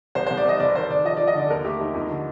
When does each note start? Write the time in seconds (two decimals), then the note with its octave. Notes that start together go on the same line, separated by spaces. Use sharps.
0.15 C2 C5
0.26 C5
0.30 C2
0.37 D5
0.45 C2 D#5
0.60 F1 D5
0.75 D#3 C5
0.90 F1 D5
1.05 F3 D#5
1.17 D5
1.20 F3
1.27 D#5
1.35 D3 D5
1.46 A4
1.50 D#2 A#4
1.65 A3 G4
1.80 D#2 D#4
1.94 F2 D#4
2.10 D3